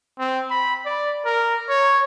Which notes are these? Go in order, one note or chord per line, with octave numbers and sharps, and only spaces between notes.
C4
B5
D5
A#4
C#5